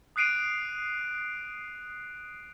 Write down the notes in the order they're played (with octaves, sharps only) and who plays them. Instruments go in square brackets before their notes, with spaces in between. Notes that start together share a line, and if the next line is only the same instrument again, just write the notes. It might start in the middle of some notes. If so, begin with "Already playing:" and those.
[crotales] D#6 F#6 C7 D7 D#7 F7